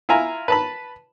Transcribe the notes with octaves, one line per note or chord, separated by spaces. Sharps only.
E4 F4 G#5 A#5
B4 A5 B5